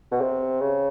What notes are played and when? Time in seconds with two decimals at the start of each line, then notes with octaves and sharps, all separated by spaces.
0.11 B2
0.21 C3
0.60 C#3